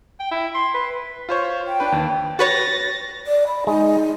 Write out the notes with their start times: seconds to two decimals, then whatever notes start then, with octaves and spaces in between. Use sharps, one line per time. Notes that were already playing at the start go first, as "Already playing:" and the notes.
0.20 G5
0.31 E4
0.55 C6
0.74 B4
1.29 F4 C5 C#5
1.68 G5
1.80 D4 B4
1.92 D#2
2.39 F#4 B4 C#5 A6 A#6
3.27 D5
3.47 B5
3.67 G#3 D#4